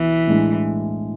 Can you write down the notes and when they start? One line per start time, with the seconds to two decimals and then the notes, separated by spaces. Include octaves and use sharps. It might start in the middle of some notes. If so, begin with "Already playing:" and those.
Already playing: B1 B2 E3
0.27 A2 G#3 D4